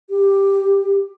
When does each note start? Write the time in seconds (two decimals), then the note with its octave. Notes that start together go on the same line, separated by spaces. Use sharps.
0.10 G4